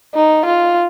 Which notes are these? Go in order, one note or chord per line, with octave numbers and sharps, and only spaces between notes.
D#4
F4